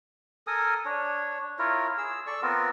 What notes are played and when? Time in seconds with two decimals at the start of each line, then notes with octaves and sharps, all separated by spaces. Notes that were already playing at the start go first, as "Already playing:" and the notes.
0.47 A4 A#4 G#5 D#6
0.85 D4 C#5
1.59 E4 F4 A#4 C#5
1.98 G#4 E6
2.27 A4 D5 C#6 E6
2.42 B3 C4 F4 A#4